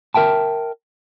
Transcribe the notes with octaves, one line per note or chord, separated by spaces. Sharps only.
A#4 E5 G5 A5